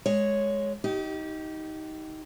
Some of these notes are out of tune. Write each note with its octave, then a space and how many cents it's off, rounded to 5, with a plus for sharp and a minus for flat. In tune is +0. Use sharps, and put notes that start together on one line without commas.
G#3 +0 C#5 +0
D#4 +15 G4 -25